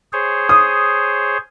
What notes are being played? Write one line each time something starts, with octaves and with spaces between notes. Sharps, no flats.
G#4 C5 C#5
D#6